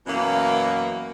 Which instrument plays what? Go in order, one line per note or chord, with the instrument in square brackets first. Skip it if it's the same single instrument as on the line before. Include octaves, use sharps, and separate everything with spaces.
[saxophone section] F#2 B2 E3 A#3